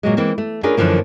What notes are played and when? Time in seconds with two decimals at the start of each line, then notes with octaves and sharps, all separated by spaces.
0.03 A#2 F#3 G#3
0.17 E3 G#3 A#3 C4
0.38 A3
0.63 C#4 D4 F4 G#4 A#4 B4
0.77 F#2 D3 E3 F3 A#3